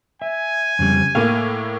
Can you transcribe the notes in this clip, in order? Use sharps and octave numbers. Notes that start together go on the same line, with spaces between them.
E5 G#5
F2 C#3 G3
A2 A#3 F5